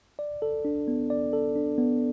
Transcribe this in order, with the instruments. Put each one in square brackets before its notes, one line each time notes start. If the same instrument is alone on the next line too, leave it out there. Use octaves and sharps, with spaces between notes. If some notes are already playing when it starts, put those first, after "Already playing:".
[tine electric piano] D5
A4
D4
B3
D5
A4
D4
B3